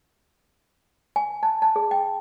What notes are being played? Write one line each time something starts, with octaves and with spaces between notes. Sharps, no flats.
G#5
A5
A5
G#4
G5